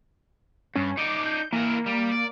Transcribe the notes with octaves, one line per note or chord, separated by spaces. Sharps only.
G2 C#4
D#4 D5 D6
G6
E3 A#3 A#4
G3
D5